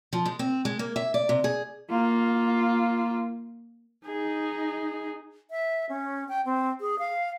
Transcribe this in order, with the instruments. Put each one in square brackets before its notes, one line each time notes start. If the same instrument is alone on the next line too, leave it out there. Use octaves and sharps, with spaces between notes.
[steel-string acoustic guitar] F3
G#3
C4
G#3
A#3
E5
D5
C3
G#4
[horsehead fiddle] A#3 F4
[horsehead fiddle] D#4 [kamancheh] G#4
[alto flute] E5
C#4
G5
C4
G#4
F5